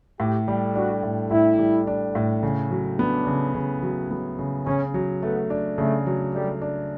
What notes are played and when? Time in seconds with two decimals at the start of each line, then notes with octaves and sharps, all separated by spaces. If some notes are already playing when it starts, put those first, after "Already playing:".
0.20 A2 G4
0.48 G3
0.75 D4 F#4
1.03 A2
1.31 A2 E4
1.59 G3
1.87 D4
2.15 A2
2.43 C#3
2.71 F#3
2.99 B3 D4
3.27 C#3
3.54 C#3
3.83 F#3
4.11 B3
4.39 C#3
4.66 C#3 C#4
4.94 F#3
5.22 A3 B3
5.50 D4
5.78 C#3 A3
6.06 F#3
6.34 G3 A3
6.62 D4